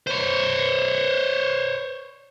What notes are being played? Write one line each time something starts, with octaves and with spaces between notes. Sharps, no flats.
C5 C#5